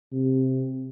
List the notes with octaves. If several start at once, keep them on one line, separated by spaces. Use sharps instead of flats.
C3